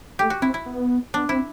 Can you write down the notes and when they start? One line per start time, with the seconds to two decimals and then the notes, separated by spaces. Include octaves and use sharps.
0.19 A3 G4
0.30 F#4
0.42 C4 E4
0.54 E4
0.66 B3
1.14 B3 D4
1.29 C4 E4